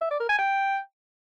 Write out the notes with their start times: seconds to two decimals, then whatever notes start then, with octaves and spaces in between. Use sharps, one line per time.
0.01 E5
0.11 D5
0.20 A#4
0.29 G#5
0.38 G5